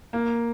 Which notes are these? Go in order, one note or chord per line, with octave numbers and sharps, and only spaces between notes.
A#3